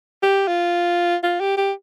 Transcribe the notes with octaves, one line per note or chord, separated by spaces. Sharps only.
G4
F4
F4
G4
G4